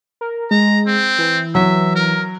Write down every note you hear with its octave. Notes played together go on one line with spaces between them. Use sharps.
A#4
G#3 A#5
C4
E3
F#3 E5
A#4